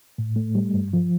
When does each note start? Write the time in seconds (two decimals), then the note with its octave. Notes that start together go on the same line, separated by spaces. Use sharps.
0.18 A2
0.36 A3
0.55 G3
0.74 G2
0.93 F3